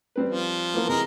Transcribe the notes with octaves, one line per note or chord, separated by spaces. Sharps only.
G3 C4 B4
F3
E3 A#3 B3
C3 E3 G#3 A#4